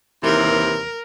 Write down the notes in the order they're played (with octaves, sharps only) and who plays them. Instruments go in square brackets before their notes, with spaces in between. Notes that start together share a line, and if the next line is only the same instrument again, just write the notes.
[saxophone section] D#2 C3 E3 [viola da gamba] A#4